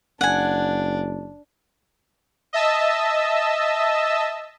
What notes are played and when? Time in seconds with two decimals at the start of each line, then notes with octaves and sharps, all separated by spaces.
0.21 F#1 D4 F#5 G#5
2.53 D#5 E5 A5 E6